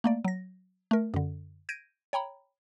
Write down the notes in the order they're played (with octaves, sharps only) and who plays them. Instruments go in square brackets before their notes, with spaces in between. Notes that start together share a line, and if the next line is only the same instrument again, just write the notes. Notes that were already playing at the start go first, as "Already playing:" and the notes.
[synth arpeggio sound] A3 A#3 D5
F#3 A#6
A3 A#4
F#2 D3
G6 G#6 A#6 D7 D#7
C#5 G5 A#5 B5